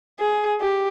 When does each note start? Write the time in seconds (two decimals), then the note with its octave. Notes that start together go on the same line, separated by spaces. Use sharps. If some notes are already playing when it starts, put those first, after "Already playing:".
0.19 G#4
0.60 G4